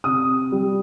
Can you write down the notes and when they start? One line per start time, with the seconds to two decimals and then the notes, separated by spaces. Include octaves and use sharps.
0.04 C3 D#6
0.52 G3